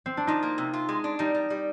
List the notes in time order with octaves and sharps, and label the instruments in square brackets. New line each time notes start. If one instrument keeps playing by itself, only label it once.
[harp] C4
D4
[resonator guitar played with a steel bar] F3 [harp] D#4
[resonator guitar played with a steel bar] A#3
C3
F4
G#3
D4
[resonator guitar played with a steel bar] G3 [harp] D#4
[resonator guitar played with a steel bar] G3
G3